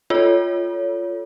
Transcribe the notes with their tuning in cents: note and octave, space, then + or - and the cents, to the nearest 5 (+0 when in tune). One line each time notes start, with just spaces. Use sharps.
F4 +0 A4 +0 C#5 +25